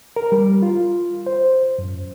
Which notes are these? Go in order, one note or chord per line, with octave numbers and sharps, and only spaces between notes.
A#4
G3
F4
C5
F#2